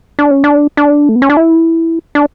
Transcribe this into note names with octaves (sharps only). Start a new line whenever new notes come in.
D4
C#4
D4
D4
A3
B3
C#4
D4
E4
D4